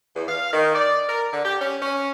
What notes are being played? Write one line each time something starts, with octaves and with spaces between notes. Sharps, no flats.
E2
F5
D#3
D5
A#4
D3
G4
C#4
C#4